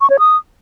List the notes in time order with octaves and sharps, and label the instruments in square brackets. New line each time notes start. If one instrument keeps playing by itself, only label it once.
[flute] C#6
C#5
D#6